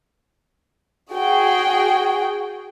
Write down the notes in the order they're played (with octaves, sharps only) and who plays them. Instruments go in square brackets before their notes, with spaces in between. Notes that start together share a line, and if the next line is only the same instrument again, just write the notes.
[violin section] F#4 G#4 G5